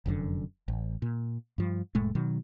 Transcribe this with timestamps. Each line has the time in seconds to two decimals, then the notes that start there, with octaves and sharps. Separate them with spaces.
0.06 F1 F#2 B2 D3
0.68 A1
1.02 A#2
1.58 G2 F3
1.95 F1 A2 G#3 A3
2.15 B2 D#3 F#3